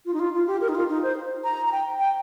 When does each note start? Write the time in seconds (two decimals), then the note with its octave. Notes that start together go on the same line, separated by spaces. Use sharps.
0.06 F4
0.14 D#4
0.20 F4
0.33 F4
0.47 G4
0.61 A#4
0.69 D#4
0.75 F4
0.89 D#4
1.03 C5
1.44 A#5
1.66 A#5
1.72 G5
1.99 G5